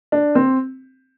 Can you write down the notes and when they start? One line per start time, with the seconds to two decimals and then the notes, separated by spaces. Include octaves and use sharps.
0.12 D4
0.35 C4